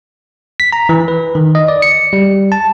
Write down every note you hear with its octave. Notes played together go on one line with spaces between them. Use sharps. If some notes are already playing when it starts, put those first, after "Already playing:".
B6
A#5
E3
B4
D#3
D#5
D5
C#7
G3
A5